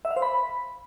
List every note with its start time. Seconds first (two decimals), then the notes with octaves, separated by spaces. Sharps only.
0.05 E5
0.11 F5
0.16 C5
0.22 B5